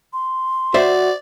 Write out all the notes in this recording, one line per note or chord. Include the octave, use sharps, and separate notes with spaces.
C6
F#4 C5 D5 E5